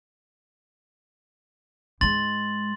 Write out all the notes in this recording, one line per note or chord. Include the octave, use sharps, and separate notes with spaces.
G#2 G#3 C6 A6 F#7